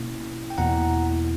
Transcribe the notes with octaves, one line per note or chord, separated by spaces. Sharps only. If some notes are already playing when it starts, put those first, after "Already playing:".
Already playing: B2 A#3 C#4 E4
G5
E2 B2 A#3 E4 F#5 A#5